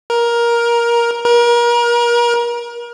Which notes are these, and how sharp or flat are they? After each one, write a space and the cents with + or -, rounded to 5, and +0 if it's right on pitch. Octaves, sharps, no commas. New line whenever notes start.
A#4 +15
A#4 +35